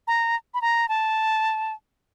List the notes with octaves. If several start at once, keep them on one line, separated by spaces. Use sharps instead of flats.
A#5
B5
A#5
A5